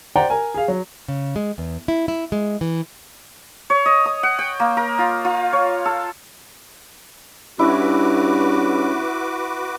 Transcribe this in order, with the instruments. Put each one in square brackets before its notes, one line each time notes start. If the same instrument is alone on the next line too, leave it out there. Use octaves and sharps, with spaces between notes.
[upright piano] C5 D5 F#5 G5 A#5
A#4 G#5
G#4 F5
F#3
[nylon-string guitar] C#3
G#3
E2
E4
E4
G#3
E3
[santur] C#5
D#5
D#6
F#5
G5
A#3
A#4
F4
F4
C#5
A4
[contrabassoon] G2 [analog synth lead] C#4 [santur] E4 [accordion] F#4 B4 D6